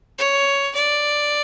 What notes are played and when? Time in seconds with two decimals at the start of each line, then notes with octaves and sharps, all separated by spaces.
0.19 C#5
0.75 D5